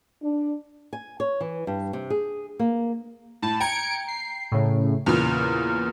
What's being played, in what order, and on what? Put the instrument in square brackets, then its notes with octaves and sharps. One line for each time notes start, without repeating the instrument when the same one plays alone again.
[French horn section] D4
[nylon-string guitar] G#5
C#5
E3
G2
C3
G#4
A#3
[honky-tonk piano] A2 [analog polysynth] A5
[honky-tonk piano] G5 A#5 [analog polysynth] G#6 C#7 D7
[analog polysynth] C7
A2 C#3
[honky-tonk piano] E2 A#2 C#3 [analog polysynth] F6